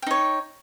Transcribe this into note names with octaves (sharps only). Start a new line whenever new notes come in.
D#4 C#5 G5